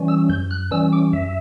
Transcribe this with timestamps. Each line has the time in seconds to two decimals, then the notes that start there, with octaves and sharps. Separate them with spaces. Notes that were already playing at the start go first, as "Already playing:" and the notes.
Already playing: E3 G3 C#4
0.08 E6
0.29 F#2 G6
0.51 F#6
0.71 E3 G3 C#4 E6
0.93 D6
1.13 F#2 E5